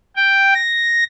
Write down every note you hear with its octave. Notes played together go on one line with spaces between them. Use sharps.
G5
A#6